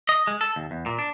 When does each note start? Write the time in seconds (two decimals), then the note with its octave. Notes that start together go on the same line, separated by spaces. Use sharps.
0.09 D#5
0.27 G#3
0.41 A4
0.56 D#2
0.71 E2
0.86 A#2
0.99 D4